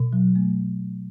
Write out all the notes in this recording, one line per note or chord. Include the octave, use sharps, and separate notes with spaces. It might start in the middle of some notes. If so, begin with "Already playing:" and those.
Already playing: B2
F#3
A3